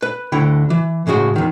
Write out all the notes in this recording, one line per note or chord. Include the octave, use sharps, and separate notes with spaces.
B4
D2 D3 E4 G5
E3
A2 C#3 G#3 F#4
E2 D#3